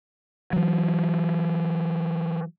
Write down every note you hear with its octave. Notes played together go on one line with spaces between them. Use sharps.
E3 F#3